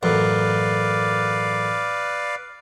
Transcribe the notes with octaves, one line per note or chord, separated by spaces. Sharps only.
A1 F#2 B4 D5 F5